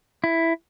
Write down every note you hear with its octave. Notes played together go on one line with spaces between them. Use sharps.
E4